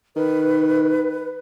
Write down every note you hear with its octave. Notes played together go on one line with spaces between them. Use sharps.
D#3 B4